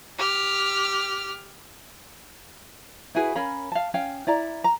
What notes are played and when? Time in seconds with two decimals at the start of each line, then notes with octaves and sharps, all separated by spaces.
0.18 G4 F6
3.15 E4 F#4 G#4 B4
3.35 C#4 A#4 F5 B5
3.72 F5 A5
3.94 C#4 F5 G5
4.27 E4 D5 A#5
4.64 A#5